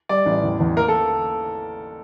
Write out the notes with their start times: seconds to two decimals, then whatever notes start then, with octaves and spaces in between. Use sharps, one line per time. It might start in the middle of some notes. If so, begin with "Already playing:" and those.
0.09 G3 D5
0.26 A1
0.43 E2
0.60 E2
0.77 A#3 A#4
0.88 A4